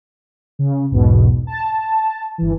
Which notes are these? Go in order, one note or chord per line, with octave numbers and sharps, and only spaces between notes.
C#3
B1 E2 G#2 B2
A5
G1 E3